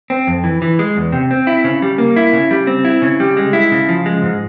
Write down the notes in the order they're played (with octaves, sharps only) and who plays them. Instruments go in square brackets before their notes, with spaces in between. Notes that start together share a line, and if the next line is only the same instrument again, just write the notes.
[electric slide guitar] C4
F2
E3
E3
G#3
E2
C3
C4
E4
C#3
G3
A#3
E4
C#3
G3
C4
E4
C#3
G3
G#3
E4
C#3
F3
G#3
G#2